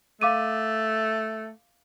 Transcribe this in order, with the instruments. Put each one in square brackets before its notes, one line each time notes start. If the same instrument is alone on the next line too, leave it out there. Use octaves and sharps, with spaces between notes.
[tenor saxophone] A3 [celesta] F5 D6 D#7